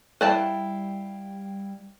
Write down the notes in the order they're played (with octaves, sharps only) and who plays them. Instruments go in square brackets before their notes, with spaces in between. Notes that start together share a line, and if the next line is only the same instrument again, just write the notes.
[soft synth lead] G3 [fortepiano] E4 F5 G5 [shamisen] B4 D5 A5